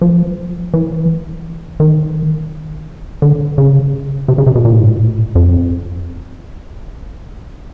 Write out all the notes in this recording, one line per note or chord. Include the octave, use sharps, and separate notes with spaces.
F3
E3
D#3
D3
C#3
C3
C#3
C3
B2
A#2
A2
G#2
A2
F2